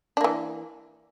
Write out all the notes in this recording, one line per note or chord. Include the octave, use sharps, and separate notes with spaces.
E3 A#3 D4